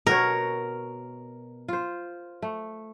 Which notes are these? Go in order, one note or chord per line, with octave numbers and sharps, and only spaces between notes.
B2 F#4 A#4 C#5
F4 C5
A3